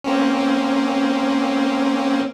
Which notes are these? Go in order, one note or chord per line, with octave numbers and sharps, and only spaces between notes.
A#3 C4 C#4